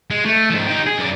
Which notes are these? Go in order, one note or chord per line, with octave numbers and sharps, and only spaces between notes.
G#3
A3
G#2 F3
D#4 G4
G#4
F#2 D5